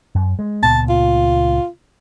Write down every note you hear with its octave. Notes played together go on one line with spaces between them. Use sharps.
F#2
G#3
C#2 A#2 B3 A5
F4